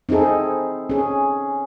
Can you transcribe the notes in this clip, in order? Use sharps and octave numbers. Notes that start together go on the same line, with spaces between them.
C4 D#4 E4 G#4 A4
C#4 G#4